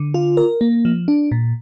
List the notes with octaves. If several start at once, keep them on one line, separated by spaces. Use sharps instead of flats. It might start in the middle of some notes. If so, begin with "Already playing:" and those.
Already playing: D3
F4
A#4
A#3
F3
D4
A#2